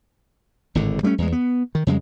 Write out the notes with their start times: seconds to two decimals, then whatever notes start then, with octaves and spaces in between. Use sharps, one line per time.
0.75 G#1 A2 D3
1.03 G3 A3 A#3 C#4
1.18 E2 G#3
1.32 B3
1.75 D#3
1.87 F2 C#3 G3 G#3